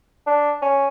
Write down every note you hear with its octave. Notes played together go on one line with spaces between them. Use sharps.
D4
C#4